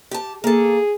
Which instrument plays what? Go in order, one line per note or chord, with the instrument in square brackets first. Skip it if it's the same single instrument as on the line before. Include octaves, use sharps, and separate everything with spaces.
[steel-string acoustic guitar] G4 A5
[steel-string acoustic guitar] A#3 A4 [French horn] G#4